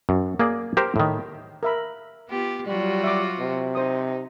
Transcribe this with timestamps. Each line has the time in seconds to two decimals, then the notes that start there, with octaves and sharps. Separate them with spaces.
0.09 F#2
0.39 A#3 G#4 D5
0.77 G4 A#4 C5
0.96 A2 D#3
1.63 A#4 E5 B5
2.29 B3 F4 G4
2.67 F#3 G3 F4 F#4
3.04 E5 D6
3.39 C3
3.75 D#4 C5 D#6